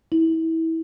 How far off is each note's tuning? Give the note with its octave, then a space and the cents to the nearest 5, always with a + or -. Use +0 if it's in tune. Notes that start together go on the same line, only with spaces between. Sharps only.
E4 -25